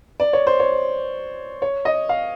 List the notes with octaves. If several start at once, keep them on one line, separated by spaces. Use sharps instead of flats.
D5
C#5
C5
C#5
C#5
D#5
F5